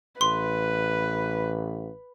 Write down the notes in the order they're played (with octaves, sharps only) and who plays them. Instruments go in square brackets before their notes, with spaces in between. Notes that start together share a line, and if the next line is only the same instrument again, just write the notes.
[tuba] A1 [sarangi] B4 [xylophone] C6